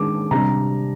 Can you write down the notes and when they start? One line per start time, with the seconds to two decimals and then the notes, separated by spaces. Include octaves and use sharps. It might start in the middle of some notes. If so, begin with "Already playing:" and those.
Already playing: D#3 G#3 D4 D6
0.31 C3 G3 D4 A#5